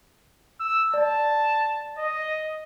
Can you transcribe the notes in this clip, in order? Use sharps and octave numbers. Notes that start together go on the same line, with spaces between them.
E6
D5 A5
D#5